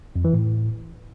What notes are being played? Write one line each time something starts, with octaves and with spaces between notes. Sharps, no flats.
F2
E3
A2